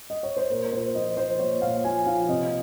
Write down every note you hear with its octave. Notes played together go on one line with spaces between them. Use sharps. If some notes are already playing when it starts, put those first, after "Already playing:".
D#5
C#5
C5
A#2 A#4
A#2 C5
F3 D#5
F3 C5
A#2 C#5
A#2 F5
F3 G#5
F3 F5
C3 D#5